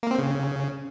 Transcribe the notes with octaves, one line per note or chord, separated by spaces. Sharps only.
A#3
C4
C#3